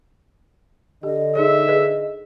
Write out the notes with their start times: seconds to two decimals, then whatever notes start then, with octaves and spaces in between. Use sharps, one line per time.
1.03 D3 G4 D#5
1.35 D#4 G#4 C#5 E5
1.68 G#4 B4